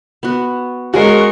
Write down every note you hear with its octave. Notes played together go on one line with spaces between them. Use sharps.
B3 F#4
G#3 C#4 F#4 G#4 A#4 G#5 C#6